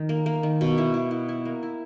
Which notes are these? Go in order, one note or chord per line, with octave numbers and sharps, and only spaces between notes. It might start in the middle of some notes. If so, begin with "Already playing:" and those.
Already playing: D#3
A#3
A#3
D#3
B2
E4
E4
E4
E4
A#3
E4